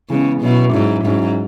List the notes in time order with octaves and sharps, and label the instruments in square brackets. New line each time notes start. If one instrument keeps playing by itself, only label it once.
[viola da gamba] C#3 [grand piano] E3 G#3 B3
[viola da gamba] B2 [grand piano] F#3 C#4 E4
[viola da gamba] G#2 [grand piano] F#3 C#4 E4
[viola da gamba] G#2 [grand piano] F#3 C#4 E4